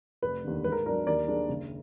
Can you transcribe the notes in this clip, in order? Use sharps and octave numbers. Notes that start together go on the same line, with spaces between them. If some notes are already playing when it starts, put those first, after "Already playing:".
F1 B4
D#2 D3
G#2 B4
A#4
F#3 B3 D4 A#4
D#2 A#4 D5
D#3 G#3 D4
F#1